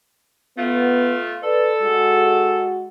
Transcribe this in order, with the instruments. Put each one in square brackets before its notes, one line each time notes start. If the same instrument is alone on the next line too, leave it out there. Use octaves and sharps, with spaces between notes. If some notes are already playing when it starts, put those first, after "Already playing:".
[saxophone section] A3 F4 [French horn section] B3
[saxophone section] A4 [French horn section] B4 D5
[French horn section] G#3 F#4